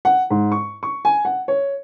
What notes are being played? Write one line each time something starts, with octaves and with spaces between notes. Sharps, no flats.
F#5
G#2
C#6
C#6
G#5
F#5
C#5